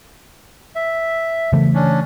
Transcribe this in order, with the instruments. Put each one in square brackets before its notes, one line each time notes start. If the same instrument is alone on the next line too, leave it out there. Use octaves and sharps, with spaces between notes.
[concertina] E5
[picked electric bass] C#3 E3 A3
[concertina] C#4 D4